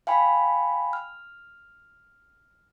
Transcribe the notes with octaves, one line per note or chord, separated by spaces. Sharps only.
F5 G5 G#5 B5
F6